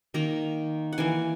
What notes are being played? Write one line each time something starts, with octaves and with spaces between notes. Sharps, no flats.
D#3 A#3 A#5
F#5
E3 A#3 G#5